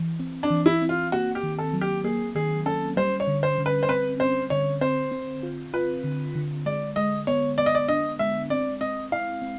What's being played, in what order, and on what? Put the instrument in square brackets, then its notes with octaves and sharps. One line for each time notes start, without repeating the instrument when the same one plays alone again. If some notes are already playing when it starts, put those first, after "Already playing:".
Already playing: [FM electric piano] E3
C4
[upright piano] D4
[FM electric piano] E3
[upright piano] E4
[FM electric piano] C4
[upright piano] F4
[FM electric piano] A#3 [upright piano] F#4
[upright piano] G4
[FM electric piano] D#3
[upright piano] A4
[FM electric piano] F#3
[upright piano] G4
[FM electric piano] A#3 [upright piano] G#4
[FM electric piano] D#3 [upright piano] G#4
[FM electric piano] C#4 [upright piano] A4
[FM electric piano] G3 [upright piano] C5
[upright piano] C#5
[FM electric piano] D3
[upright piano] C5
[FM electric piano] D3
[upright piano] B4
C5
[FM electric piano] C4 [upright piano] B4
[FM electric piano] C4 [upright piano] C5
[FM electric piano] D3 [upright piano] C#5
[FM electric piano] C4 [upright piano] C5
[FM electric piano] C4
F4
[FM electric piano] F4 [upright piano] B4
[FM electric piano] D3
D3
[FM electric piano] G#3 [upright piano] D5
[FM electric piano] G#3 [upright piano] D#5
[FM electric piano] B3 [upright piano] C#5
[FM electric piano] B3 [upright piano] D5
[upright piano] D#5
D5
[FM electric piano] D4 [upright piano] D#5
[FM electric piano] G#3 [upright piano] E5
[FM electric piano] C4 [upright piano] D5
[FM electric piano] C4 [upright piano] D#5
[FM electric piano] E4 [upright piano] F5
[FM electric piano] C4